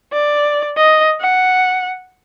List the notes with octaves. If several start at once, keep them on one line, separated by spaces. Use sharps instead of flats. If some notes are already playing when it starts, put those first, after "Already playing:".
D5
D#5
F#5